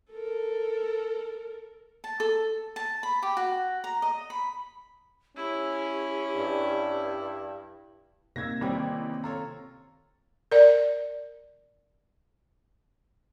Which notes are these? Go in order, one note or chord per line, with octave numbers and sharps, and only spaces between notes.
A4 A#4
A5
A4
A5
B5
G4
F#4
A#5
D#5
B5
C#4 E4 G4
G2
C3 A#3 D#4 E6 G#6 A#6
A1 D#3 G3 C4 C#4 G4
F4 A4 C#5 A#5
A#4 D5